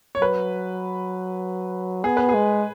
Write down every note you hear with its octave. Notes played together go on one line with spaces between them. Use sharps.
C#5
F#3 B4
B3 G#4
B4
G#4
G#3